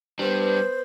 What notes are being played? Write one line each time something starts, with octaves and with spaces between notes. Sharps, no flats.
G3 B3 D4 B4 C5